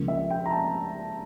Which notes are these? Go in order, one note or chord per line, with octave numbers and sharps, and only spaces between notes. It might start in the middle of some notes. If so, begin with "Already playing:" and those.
Already playing: C#2 C#3 F3 A#3
E5
G5
A#5
A5